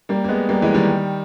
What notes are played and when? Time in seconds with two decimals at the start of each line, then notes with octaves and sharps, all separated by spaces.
0.09 G3 A#3
0.24 A#3
0.29 G#3 B3
0.49 G3 A#3
0.62 E3 G#3
0.74 D#3 G3